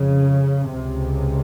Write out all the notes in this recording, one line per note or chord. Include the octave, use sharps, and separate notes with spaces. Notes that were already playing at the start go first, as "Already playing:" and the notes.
Already playing: F2 C#3
C#2 C3